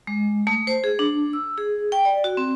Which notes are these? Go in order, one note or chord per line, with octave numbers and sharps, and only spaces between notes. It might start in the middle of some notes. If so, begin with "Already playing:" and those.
G#3
A3
C5
G#4
D4
E6
G#4
G5
D5
F#4
C4